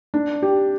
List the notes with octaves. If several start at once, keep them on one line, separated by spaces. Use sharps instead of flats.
D4
G4